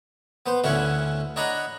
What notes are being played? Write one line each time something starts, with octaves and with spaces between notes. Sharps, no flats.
B3 C5
D2 D3 C#4 E4 C#5 F#5
D4 C#5 D#5 F#5 A#5 B5